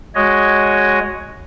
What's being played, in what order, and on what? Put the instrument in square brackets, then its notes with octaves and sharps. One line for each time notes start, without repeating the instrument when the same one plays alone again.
[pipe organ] G#3 F#4 C#5 D#5